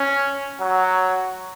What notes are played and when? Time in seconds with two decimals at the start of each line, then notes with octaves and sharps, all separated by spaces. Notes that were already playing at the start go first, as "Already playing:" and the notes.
Already playing: C#4
0.60 F#3